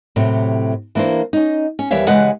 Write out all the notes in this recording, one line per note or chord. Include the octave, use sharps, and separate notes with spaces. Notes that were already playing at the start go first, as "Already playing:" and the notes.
A2 C3 F#3
E3 A#3 D4 E4 C5
C#4 D#4
C#4
D#2 E3 G3 C#5 E5 F5
C#3 E3 G#3 B4 F#5